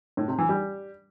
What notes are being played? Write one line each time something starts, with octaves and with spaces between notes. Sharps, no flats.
A2
C3
E3
G3